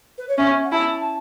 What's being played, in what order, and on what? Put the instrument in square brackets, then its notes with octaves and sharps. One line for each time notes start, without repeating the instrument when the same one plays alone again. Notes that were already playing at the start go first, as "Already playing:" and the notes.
[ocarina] B4
C#5
[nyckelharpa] C#4 [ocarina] E5
[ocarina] F#5
[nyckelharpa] E4 [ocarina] A5